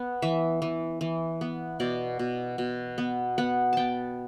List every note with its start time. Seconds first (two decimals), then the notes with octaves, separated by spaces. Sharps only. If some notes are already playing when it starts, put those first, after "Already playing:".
Already playing: B3
0.22 E3 E5
0.62 E3
1.01 E3
1.41 B3
1.80 B2 D5
2.19 B2
2.58 B2
2.98 B3
3.38 B3 F#5
3.73 B3 G5 A5